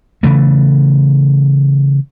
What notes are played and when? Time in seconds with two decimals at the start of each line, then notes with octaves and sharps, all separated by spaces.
0.23 C#3 E3 A3